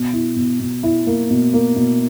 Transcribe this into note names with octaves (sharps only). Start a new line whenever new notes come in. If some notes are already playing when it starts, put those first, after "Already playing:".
Already playing: B2
E4
B2
B2
E4
A#3
B2
A#3
B2